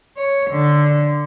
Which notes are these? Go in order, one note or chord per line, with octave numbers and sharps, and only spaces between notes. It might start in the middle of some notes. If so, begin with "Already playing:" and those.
C#5
D3